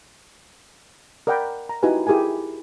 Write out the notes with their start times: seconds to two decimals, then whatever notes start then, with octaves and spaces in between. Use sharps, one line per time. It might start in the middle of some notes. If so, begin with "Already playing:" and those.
1.27 A#4 D5 F#5 G5 A#5 B5
1.69 A#5
1.83 D#4 E4 F#4 G4 B4 G#5
2.07 E4 G4 G#4 A#4 G#5